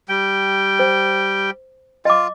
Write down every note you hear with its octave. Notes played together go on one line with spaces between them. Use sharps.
G3 G5
C5
F4 D#5 D6